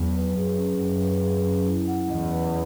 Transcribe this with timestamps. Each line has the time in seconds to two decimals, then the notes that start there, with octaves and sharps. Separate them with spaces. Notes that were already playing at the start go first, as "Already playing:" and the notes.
Already playing: E2 F#3
0.15 B4
0.36 F#2 G#4
0.58 C#4
0.80 F#2 F#3
1.02 B4
1.23 G#4
1.45 C#4
1.66 E4
1.88 F#5
2.10 E2 D#5
2.31 B4